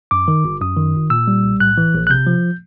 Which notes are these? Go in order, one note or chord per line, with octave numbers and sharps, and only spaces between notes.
F#2 D6
D#3
G1
F#2 D#6
D#3
G1
A#2 E6
G3
B1
A2 F#6
E3
A#1
F#6
C3 G6
F3